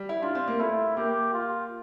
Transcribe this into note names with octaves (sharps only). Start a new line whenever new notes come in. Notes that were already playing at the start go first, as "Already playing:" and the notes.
Already playing: G3
E4
D4 F4
C4
A#3
A3 E4
A#3 G4
F4